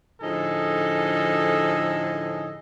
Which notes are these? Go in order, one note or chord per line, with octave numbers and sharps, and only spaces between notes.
A2 D3 F3 D#4 G#4 A4